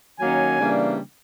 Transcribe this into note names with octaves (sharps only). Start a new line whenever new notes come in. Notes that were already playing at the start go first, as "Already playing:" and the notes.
D#3 F#3 A#3 C#4 G#5
C#3 E3 G3 A#3 D4